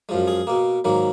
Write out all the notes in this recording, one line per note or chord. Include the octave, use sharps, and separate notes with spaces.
F#2 F3 G#3
G#4
B2 A#3
G#2 D#3 F#3 A#3